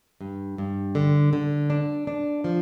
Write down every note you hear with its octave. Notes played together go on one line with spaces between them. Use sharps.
G2
G2
D3
D3
D4
D4
F3